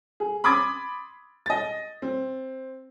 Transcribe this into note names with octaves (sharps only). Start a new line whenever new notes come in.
G#4
B5 C6 D6 D#6 G#6 A6
D#5 A6
C4